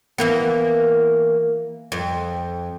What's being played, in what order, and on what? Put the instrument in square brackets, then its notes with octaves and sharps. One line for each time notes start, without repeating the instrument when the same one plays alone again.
[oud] E3 A#3 B3
F2